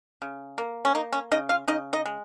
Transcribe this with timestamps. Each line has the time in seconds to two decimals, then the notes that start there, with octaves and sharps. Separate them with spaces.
0.22 C#3
0.58 A#3
0.85 C#4
0.95 A#3 D#4
1.13 C#4
1.31 C#3 D#4 D#5
1.49 F4 F5
1.68 C#3 D#4 D#5
1.93 D#4 D#5
2.06 G#3